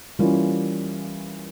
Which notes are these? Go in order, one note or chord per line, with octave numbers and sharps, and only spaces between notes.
E3 G3 A#3 C#4 F4